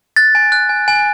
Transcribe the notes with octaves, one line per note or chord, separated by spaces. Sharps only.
F#6 A6
G#5
F#6
G#5
G#5